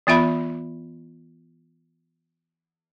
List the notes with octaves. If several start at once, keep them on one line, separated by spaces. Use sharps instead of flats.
E3 B3 F4 E5 B5